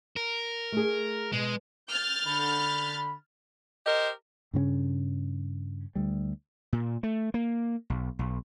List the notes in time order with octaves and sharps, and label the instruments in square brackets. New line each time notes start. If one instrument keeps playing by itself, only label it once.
[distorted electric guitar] A#4
[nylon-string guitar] A3 G#4
[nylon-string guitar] B2 [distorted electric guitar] G#3
[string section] F6 G6 A6
[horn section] D3 B5
[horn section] G4 A#4 C5 [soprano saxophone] D#5
[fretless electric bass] G2 C#3 C4 C#4
D2 G3
[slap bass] A#2
A3
A#3
B1
B1